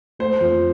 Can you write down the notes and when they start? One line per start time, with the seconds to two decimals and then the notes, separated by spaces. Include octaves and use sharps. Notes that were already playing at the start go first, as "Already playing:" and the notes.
0.19 A3 C5
0.40 F2